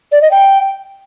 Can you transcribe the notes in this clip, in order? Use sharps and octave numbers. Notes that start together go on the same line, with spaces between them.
D5
D#5
G5